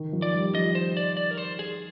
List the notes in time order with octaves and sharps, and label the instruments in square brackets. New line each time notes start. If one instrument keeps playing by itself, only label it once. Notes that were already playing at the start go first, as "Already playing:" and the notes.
Already playing: [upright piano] D#3
F3
[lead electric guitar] D5
[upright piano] G3
[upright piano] F3 [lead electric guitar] D#5
[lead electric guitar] C5
D5
D5
A#4
C5
G#4